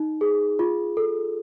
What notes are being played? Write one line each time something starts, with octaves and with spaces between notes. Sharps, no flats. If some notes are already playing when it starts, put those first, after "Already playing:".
Already playing: D#4
G#4
F4
A4